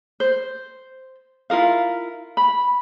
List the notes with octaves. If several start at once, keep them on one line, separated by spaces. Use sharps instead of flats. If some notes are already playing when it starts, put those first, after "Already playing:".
C5
E4 F4 A#4 F5
B5